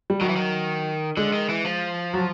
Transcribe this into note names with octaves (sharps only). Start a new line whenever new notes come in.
G3
D#3 F#3
E3
D#3
D3 G#3
D#3
E3
F3
F#3